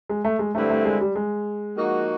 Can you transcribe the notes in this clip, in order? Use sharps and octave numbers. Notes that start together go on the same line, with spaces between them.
G#3
A3
G#3
G2 D3 G3 A3 C4 E4
A3
G#3
G3
G#3
F3 A#3 D#4 F#4